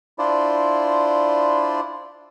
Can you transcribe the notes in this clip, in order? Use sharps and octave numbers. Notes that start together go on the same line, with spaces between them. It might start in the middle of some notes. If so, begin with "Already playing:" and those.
D4 E4 F4 C5 D5